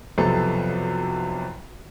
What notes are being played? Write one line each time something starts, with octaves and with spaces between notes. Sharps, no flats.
B1 F2 C3 B3 A4